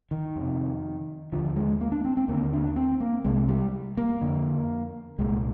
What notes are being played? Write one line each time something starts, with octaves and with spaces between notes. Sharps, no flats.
D#3
F2 C3
D#2 D3 F3
G#3
A#3
D4
C4
C4
D#2 D3 A#3
D4
C4
A#3
C2 C3 G#3
G3
A#3
F2 D3
C2 A#2 G#3